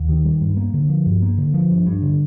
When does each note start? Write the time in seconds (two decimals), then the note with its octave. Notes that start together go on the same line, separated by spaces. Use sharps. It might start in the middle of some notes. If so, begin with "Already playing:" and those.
Already playing: D#2
0.09 D#3
0.25 G3
0.41 G2
0.57 A#3
0.74 D3
0.89 F3
1.06 G2
1.22 A#3
1.38 D3
1.54 F3
1.70 G2
1.86 G2
2.02 D3